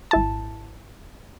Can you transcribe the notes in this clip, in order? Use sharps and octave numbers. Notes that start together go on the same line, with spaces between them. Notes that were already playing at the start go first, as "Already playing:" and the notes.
G#1 E4 A5